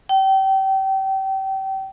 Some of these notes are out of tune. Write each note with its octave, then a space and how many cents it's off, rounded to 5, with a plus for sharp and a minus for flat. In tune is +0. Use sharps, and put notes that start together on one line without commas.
G5 -30